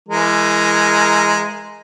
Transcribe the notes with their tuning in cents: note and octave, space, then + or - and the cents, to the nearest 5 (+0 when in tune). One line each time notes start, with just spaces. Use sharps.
E3 +25 G#3 +0 A#4 -5